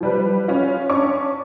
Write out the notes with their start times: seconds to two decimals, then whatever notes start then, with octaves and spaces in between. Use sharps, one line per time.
0.01 F3 G3 B4
0.48 C#4 F4
0.89 C#4 D4 C#6 D6